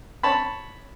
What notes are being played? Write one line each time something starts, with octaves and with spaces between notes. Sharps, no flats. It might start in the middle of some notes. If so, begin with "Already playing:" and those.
C#5 A5 B5